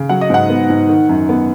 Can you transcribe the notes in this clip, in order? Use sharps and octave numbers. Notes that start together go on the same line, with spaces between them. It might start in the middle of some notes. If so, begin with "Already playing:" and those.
Already playing: C#3
F#3 F#5
D#5
G#2 F#5
B3
G#2
D#3
F#2
B3